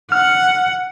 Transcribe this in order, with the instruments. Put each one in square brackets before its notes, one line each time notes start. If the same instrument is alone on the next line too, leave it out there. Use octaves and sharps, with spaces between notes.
[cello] F#5 [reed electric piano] F6